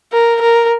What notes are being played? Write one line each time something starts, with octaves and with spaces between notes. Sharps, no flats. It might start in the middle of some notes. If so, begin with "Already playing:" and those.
A#4
A#4